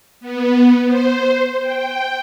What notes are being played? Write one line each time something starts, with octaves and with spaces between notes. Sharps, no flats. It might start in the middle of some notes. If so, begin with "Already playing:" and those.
B3
C5
G5